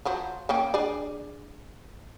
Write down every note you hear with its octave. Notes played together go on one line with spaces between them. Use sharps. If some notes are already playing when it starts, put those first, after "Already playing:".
F3 F#3 C5
A#3 C#4 G5
D4 G#4 D5